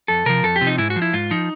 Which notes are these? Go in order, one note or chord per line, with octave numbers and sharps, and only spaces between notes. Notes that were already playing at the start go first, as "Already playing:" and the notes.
F2 A4
C3 F3 A#4
F2 A4
G4
C3 F3
D#4
G#2 E4
F#4
F3
E4
G#2 F4
F3 D#4